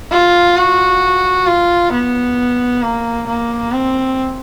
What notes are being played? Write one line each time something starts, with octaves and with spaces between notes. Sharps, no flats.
F4
F#4
F4
B3
A#3
A#3
C4